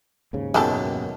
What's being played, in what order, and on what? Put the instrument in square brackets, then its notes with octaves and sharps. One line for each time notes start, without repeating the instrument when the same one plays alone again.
[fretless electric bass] D#2 G#2 C#3
[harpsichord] F#2 B2 D#3 [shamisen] G#3 G4 A4